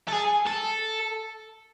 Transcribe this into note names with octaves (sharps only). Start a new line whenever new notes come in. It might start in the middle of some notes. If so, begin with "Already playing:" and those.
A4
G#4
A4